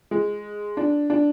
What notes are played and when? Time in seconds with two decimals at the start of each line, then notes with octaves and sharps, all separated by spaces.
0.11 G#3
0.77 D4
1.10 D4